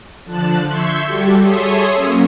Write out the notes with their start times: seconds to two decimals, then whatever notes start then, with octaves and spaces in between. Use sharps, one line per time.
0.25 D3 F3 A5 F#6
0.66 E5 C6 C#6 G6 G#6
1.05 G3 F#4 G4 A4
1.41 G#4 A4 C#5 E5 C6 D#6
1.93 F#3 A#3 C#4